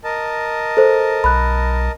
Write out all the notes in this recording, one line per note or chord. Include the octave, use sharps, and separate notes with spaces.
A#4 D#5 A5
A4 C5
B1 B5 F#6